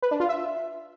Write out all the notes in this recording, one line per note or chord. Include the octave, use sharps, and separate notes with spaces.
B4
D4
F4
E5